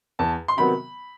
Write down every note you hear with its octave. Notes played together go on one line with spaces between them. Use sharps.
E2 A5
C6
C3 D#3 F#3 B3 B5